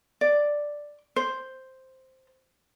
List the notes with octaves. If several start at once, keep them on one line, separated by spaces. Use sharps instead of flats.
D5
C5